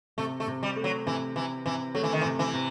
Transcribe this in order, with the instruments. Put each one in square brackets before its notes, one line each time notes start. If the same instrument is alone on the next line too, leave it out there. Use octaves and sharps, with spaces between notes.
[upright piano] C3 [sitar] A3
[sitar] A3
[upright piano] C3
[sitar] G3
[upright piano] A3
[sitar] F#3
[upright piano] C3 [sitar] E3
[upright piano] C3 [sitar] E3
[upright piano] C3 [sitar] E3
[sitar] F#3 [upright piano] A3
[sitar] E3
D#3
E3
[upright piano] C3
[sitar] E3
[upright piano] C3